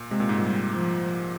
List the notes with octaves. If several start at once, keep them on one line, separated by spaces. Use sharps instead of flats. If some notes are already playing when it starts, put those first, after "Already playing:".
Already playing: A#2
C3 G#3
A#2
G#2
A#2 G3
F3